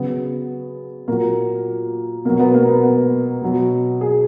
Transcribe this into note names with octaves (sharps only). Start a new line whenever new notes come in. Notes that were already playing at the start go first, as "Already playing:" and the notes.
Already playing: C#3 F#3 B3
A#2 F#3 A#3
B2 F#3 A#3
B3
A#3
B3
B3
B2 F#3
G#4